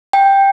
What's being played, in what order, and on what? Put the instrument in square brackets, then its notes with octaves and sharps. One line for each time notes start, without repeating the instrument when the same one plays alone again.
[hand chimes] G5